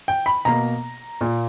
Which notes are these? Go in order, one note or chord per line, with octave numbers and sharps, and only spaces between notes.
G5
B5
B2 A#3 A#5
A#2 A#3